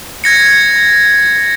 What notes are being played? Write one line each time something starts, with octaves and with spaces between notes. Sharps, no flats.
G#6 A#6 C#7